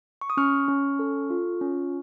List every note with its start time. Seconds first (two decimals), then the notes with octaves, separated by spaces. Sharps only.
0.21 C#6
0.30 D#6
0.37 C#4 C#6 F6
0.68 C#4
0.99 A4
1.30 F4
1.61 C#4